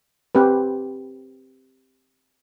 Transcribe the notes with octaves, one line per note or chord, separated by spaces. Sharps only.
C4 G4 B4